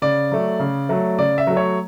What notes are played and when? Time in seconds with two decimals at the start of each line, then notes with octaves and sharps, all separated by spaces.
0.02 C#3 D5
0.32 F#3 A3
0.60 C#3
0.89 F#3 A3
1.18 C#3 D5
1.38 E5
1.47 F#3 A3
1.57 C#5